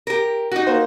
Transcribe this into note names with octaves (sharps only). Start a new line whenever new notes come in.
G4 A#4
D#4 F#4
A#3 C5